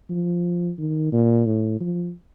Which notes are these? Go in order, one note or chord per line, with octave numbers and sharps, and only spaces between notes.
F3
D#3
A#2
A2
F3